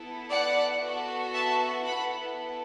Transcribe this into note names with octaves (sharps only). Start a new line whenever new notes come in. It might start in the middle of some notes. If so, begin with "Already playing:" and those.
Already playing: B3 E4 A4
D5 F#5
B3 F#4 A4
E5 A5
B3 E4 A4 F#5 B5